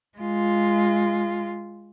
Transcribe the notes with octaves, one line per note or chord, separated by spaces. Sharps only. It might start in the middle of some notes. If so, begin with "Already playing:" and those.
G#3 F4